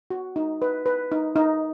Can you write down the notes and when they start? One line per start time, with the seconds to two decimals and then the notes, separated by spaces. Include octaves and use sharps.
0.10 F#4
0.36 D#4
0.62 B4
0.86 B4
1.11 D#4
1.36 D#4